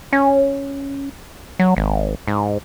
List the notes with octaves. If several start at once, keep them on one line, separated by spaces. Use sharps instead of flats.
C#4
F#3
G#1
G#2